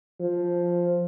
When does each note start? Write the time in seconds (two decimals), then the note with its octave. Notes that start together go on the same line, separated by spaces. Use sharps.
0.21 F3